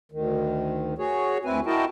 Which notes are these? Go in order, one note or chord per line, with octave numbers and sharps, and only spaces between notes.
D2 D#3
F#4 G#4 C#5
D2 C4 E4 B4 G#5
E4 F#4 A#4 D#5 G5 A5